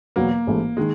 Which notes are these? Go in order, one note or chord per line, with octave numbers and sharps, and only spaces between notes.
E2 B2 F#3 A#3 B3
A1 G#2 E3 A3
D#3 G#3